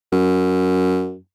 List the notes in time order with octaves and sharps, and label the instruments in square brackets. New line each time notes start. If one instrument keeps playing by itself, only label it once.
[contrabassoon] F#2